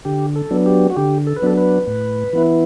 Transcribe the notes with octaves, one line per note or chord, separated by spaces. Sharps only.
D3 G4
A4
F#3 B3 D4
G4
F#4
D3 G4
A4
B4
F#3 B3 D4 A4
B4
A2
E3 B3 E4